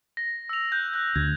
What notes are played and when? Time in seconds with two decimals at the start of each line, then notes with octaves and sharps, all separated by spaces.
0.17 A#6
0.49 E6 F7
0.72 F#6 G6
0.94 F#6 G6
1.16 D2 G#6